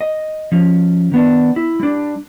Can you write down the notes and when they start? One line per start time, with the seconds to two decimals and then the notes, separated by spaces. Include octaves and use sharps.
0.01 D#5
0.52 F3 C#4
1.12 D#3 B3 D4
1.56 E4
1.80 G3 D4